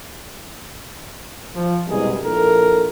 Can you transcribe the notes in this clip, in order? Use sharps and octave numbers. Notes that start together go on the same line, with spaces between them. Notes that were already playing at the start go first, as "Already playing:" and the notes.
F3
F#1 C2 B2 G3 G#3 G#4
A#1 E4 A4 A#4